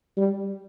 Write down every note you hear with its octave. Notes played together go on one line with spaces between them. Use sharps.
G3